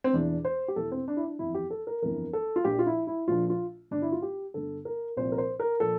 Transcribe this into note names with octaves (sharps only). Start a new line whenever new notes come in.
C4
E1 E2 E3 D4
C5
G4
E1 E2 E3 A4
C4
D4
E4
D4
G1 F2 E3 E4
G4
A4
A#4
G1 F2 E3 A#4
A4
F4
A#1 A#2 F3 G4
F4
E4
E4
A#1 A#2 F3 F4
F4
G1 G2 D3 D4
E4
F4
G4
G1 G2 D3 A4
A#4
C2 A#2 F3 C5
A#4
C5
A#4
A#2 F3 A4